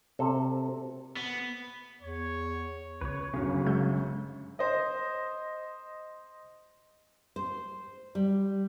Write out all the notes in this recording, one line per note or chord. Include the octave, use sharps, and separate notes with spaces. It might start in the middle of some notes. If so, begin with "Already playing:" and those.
C3 A4
B3
E2 C#5
C#2 B4 C#5
G1 F#2 C#3 F#3
G#3 E5 G6
C5 D#5
C5
G3